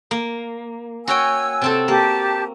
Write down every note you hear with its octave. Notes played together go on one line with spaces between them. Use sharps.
A#3
F#4 C#5 G5 G#5 E6
C3 C4 A4
A#3 G4 A5